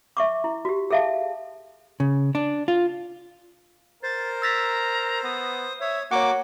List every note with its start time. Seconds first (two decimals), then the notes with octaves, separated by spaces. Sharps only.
0.17 E5 C#6 D6
0.44 E4
0.65 F#4 G4
0.91 G#4 A4 E5 F5 A5
2.00 C#3
2.35 D4
2.68 F4
4.03 A#4 C5 A6
4.42 A#5 E6 A6 B6
5.23 B3 D#6
5.81 C#5 E5
6.11 A#3 F#4 C#5 F#5 D6